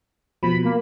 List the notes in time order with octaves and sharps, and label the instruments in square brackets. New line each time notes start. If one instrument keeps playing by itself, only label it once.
[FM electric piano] B2 F3 [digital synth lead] B5
[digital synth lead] A#3